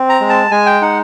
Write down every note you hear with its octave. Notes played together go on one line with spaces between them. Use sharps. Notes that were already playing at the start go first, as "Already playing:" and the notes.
Already playing: C4
A#5
G#3
A5
G#3 G#5
G5
D#4 F#5